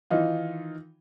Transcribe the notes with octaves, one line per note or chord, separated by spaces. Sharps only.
D#3 E3 D#4 F4